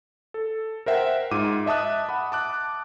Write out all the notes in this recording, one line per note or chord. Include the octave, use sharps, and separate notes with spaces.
A4
A#4 C5 E5 F#5 G5
G#2 F4 D6 D#7
D#5 E5 A5 D#6 F#6
F#5 B5
A5 D6 F#6